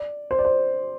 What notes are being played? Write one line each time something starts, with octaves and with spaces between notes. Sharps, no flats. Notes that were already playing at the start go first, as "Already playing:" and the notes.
Already playing: D5
C5
D5
C5